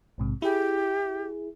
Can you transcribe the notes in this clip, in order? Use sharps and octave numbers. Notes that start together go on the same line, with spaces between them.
A#1 G#2 C3
E4 G4 G#4